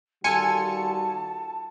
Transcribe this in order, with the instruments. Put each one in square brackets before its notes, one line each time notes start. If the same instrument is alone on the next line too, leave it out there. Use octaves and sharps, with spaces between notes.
[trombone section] D#3 G3 F#4 [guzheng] F4 A4 [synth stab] G#5 C#7 [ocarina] A5